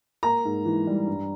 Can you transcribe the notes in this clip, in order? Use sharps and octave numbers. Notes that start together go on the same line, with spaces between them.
A#3 A#5
G#2
E3
G3
G2